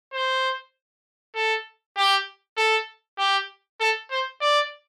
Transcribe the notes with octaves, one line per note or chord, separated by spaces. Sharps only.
C5
A4
G4
A4
G4
A4
C5
D5